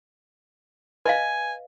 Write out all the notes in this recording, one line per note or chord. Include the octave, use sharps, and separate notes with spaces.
B4 D#5 F5 G#5